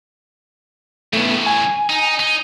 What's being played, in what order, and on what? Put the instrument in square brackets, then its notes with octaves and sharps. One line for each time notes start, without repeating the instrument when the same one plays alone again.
[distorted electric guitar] A2 C#3 [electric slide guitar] A3 B3
[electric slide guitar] G#5
[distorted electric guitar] D#4
D#4